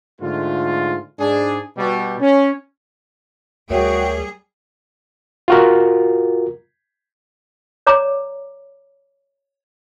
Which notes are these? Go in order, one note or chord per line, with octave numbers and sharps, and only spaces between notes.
G#2 D3 A3 F4
G#2 D4 G#4
B2 G3
C#4
D2 G3 F#4 G#4 A#4 C#5 E5 G5
F4 F#4 A#4
C#5 D5 A#5 D6